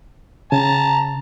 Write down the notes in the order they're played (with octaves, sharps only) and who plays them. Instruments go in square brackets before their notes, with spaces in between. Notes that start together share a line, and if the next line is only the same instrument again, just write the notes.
[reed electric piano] C#3 [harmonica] A5 A#5